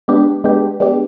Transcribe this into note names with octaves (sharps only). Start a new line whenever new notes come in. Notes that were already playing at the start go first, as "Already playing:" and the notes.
G#3 B3 D4 G4
G#3 B3 D4 G4
G#3 B3 D4 G4